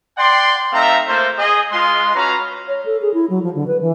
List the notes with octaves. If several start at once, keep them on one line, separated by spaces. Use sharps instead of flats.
D5 F#5 G5 C6
A3 C4 D#4 E5 F5 A#5
A3 A#3 F4 C5
G#4 D#5
G#3 F4 C6
C#4 F#4 B4 F5 A#5
C#5
A4
G#4
E4
F#3
F3
D3
B4
E3